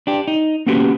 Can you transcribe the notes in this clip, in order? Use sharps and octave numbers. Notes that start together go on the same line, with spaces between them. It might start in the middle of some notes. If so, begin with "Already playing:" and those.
D4 G4
D#4
A#3 B3 C#4 F#4 G4